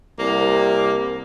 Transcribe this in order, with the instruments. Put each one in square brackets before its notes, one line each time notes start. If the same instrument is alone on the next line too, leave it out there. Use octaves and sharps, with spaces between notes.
[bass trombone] C2 [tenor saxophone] A#3